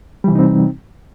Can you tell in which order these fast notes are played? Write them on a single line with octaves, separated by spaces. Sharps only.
G3 E3 C3 D#4 C4